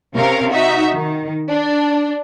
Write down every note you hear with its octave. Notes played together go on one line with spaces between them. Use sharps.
C3 C#4 A#4 F5
D#4 F#4 E5
D#3
D4